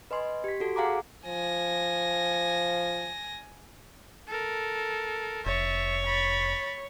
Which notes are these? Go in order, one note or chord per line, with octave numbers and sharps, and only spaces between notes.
B4 D#5 G#5 C6
G4 B6
F#4 A4
G#4 F5 F#5 G#5 A#5 D6
F3 G#5 A#6
A4 A#4
F1 C#5 E5 A6
B5 A6